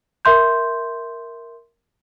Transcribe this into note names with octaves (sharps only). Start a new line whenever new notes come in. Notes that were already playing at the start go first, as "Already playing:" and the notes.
A#4 E5 C6 G6